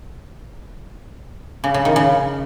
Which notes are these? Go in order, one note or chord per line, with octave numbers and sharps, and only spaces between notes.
C#3
C#3
D#3
C#3